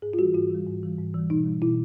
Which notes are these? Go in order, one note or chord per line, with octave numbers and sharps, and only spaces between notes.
G#2 G#4
F4
E3 G3 F#4
G#2 F4
E3 G3
G#2
E3 G3
G#2
E3 G3
B2 D#4
G3
B2 E4